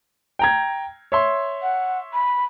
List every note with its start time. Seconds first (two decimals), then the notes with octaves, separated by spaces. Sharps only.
0.39 G5 A#5 G#6
1.12 C#5 E5 C6
1.62 F#5
2.13 B5